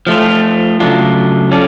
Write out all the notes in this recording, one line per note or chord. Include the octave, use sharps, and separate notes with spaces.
F3 A3 F4
C#3 F#3 A3 D4 F4
C#4 F4 A4 D5